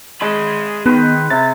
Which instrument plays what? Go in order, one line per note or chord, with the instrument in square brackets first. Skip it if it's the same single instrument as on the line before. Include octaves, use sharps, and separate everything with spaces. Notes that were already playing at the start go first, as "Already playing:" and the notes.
[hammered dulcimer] G#3 [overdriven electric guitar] G#4 B5
[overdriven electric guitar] D#3 [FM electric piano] B3 [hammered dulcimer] B4 C5
[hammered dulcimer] C3 [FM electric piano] A6